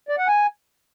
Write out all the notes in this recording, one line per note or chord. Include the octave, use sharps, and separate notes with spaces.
D5
F#5
G#5